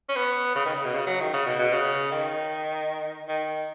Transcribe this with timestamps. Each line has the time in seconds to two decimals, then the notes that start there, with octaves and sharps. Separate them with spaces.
0.09 C#4
0.16 B3
0.56 C#3
0.65 D#3
0.75 C#3
0.85 B2
0.94 C#3
1.07 F#3
1.21 D#3
1.33 C#3
1.46 B2
1.59 B2
1.73 C#3
2.12 D#3
3.29 D#3